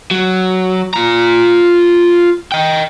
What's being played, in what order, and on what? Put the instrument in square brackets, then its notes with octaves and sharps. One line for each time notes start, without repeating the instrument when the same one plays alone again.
[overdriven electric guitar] F#3
F4 A#5
D#5 G5